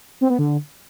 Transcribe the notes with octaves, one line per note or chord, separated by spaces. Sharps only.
C4
B3
D3